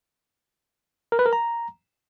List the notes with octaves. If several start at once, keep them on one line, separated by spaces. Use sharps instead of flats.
A#4
B4
A#4
A#5